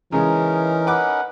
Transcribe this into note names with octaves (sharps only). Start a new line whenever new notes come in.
C#3 E3 G#3 C#4 D#4 A#4
B4 F#5 D6